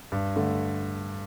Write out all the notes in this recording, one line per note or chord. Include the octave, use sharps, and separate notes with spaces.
G2
D3 A3